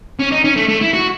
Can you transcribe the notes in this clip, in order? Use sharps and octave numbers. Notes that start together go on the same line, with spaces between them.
C#4
D#4
C#4
A3
A3
E4
F#4